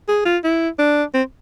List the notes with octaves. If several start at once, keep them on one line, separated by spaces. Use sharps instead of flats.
G#4
F4
E4
D4
C4